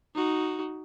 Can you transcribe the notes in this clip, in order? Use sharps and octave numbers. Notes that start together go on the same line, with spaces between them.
D#4 F#4